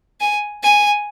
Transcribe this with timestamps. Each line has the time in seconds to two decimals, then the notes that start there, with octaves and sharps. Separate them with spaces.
0.21 G#5
0.63 G#5